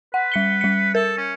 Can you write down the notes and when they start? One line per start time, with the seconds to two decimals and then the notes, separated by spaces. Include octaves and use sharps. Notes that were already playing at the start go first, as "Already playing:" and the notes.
0.14 B4 F#5
0.32 G3 C#7 G7
0.61 G3 C#7
0.95 A4 A#4
1.17 C#4